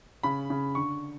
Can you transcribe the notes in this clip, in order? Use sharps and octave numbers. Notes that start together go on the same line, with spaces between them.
C#3 B5
C#3
D3 C#6